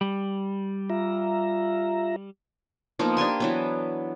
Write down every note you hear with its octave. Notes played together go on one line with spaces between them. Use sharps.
G3
F4 E5 A#5
F3 A#3 B3 D#4
D4 G4 G#5 C6
E3 F#3 B3